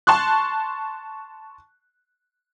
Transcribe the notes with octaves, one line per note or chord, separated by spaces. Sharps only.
A5 C6 C#6 F#6